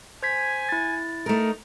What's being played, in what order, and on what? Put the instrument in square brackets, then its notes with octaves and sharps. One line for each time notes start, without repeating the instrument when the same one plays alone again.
[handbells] C5 G#6 B6 [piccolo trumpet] G#5
[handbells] E4 A6
[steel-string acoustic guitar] A3 A#4 [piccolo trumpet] D#4